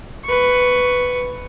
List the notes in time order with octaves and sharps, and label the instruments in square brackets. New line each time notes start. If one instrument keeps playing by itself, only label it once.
[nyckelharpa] B4 C#6